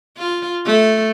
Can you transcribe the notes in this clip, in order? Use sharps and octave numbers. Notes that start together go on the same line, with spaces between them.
F4
A3